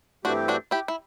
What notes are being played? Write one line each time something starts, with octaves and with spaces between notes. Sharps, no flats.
G2 E3 A3 C4 D4 F#4 G4
D4 F#4
E4 G4
E4